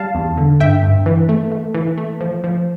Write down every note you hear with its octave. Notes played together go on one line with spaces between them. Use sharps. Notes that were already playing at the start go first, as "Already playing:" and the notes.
Already playing: G3 F5 A5
E2
D3
G2 E5 G5
G2
E3
A3
A3
E3
A3
F3
F3